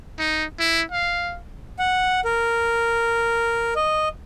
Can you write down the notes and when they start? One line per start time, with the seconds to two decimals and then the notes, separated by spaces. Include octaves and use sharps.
0.19 D#4
0.60 E4
0.92 F5
1.79 F#5
2.25 A#4
3.76 D#5